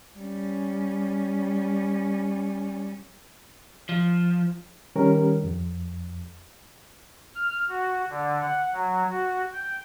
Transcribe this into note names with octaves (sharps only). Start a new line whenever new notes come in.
G3 C#4
F3
D#3 G3 C#4 G4 A#4
F2
F6
F#4
D3
F#5
F#3
F#4
G5